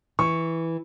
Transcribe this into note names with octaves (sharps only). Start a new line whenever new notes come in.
E3 C#6